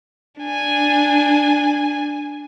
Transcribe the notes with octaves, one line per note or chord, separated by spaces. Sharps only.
D4 G#5